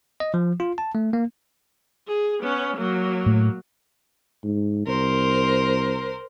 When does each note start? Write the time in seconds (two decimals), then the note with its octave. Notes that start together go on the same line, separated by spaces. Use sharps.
0.20 D#5
0.34 F3
0.60 F4
0.78 A5
0.95 A3
1.13 A#3
2.07 G#4
2.41 B3 C#4
2.77 F#3 A#3
3.26 A2 A3
4.44 G#2
4.87 C2 A#4 C5